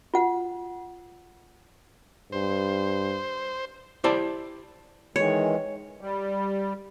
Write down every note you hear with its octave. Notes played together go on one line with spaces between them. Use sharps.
F4 F#5
G2 C5
E4 G4 C5 D5 A5
D#3 E3 G#3 C#5
G3